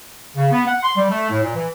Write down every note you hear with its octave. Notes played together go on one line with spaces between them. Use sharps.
C#3
B3
F#5
C6
G3
A3
A2
A#2
E3